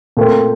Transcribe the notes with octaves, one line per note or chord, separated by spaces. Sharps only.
A#2 A3 C4